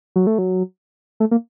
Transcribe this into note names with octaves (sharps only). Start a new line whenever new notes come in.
F#3
A3
F#3
A3
A#3